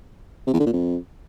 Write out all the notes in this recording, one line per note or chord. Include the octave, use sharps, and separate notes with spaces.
C3
E2
D3
A#2
F2